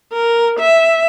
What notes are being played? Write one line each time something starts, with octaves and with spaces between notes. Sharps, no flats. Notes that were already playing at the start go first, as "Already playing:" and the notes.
A#4
E5